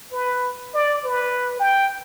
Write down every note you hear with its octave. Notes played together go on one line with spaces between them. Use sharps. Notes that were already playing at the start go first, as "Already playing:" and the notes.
B4
D5
B4
G5